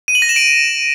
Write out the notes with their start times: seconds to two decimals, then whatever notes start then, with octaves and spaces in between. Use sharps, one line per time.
0.08 D#7
0.15 F#7
0.22 A#6
0.29 E7
0.36 D7